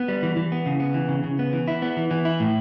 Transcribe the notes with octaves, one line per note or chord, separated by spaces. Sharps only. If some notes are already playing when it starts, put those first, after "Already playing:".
Already playing: B3
G3
E3
E3
B3
C#3
B3
E3
C#3
C#3
B3
E3
E4
B3
E3
E3
E4
A2